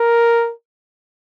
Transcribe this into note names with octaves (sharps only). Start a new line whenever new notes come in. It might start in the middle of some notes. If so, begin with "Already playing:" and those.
Already playing: A#4